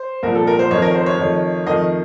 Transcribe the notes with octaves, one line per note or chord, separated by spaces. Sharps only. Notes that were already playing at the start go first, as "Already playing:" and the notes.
Already playing: C5
C2 A#2 F3 A#4
A4
A#4
C5
F2 D#3 A3 C#5
A#4
C5
C#5
F2 D#3 A3
F2 D#3 A3 D#5